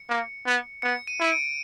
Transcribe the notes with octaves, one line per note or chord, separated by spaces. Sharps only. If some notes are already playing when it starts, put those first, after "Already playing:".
Already playing: C#7
A#3
B3
B3 C#7
D#7
E4 D#7
D7